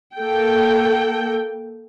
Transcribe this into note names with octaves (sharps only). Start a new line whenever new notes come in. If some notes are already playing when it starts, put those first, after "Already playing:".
A#3 A4 G5